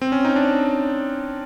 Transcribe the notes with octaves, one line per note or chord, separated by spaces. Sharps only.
C4
C#4
D#4
D4